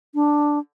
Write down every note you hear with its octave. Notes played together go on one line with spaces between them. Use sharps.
D4